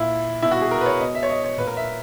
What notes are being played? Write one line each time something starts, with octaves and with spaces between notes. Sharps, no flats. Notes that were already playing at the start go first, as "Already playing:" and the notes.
Already playing: A#2 E4
B2 E4
F#4
G#4
A#4
B4
C#5
B2 D#5
E5
C#5
D#5
C#5
A#2 B4
A#4
E5